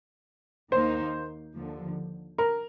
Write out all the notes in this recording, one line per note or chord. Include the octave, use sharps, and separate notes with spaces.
D#2 D#3 A#3 D#4 C5
D#2 D3 F3
A#4